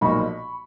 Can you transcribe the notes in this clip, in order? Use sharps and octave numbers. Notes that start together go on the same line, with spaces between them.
B1 A#2 F3 A#3 D#4 B5 C#6